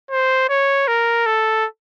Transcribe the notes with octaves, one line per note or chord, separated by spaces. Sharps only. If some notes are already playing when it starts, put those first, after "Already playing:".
C5
C#5
A#4
A4